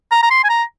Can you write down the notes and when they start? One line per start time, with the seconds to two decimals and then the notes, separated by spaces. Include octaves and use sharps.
0.11 A#5
0.23 A#5
0.30 C6
0.44 G#5
0.49 A#5